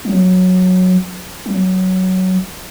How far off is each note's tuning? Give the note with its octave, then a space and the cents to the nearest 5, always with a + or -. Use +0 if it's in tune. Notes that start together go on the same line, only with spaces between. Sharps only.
F#3 -10
F#3 +10